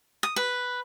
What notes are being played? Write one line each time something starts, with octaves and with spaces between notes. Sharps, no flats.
D#6
B4